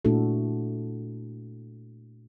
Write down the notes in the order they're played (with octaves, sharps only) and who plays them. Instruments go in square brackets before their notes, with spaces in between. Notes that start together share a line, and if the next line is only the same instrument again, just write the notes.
[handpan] A#2 A3 D4 E4 F#4 A4